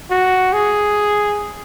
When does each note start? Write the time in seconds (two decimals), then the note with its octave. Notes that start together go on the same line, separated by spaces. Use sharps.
0.10 F#4
0.53 G#4